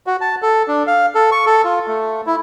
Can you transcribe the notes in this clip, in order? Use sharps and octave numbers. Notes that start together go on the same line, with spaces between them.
F#4
A5
A4
D4
F5
A4
C#6
A4
F4
A3
E4